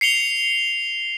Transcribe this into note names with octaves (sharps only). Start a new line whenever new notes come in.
C7 C#7 F7 G7